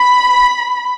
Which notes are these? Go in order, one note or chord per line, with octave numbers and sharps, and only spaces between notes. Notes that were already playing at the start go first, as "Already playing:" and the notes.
Already playing: B5